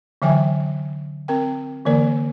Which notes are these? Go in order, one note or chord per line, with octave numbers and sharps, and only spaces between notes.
D3 E3 F#3 E5 G5 G#5
C4 A#4 G5
D3 E3 A#3 A#4 D5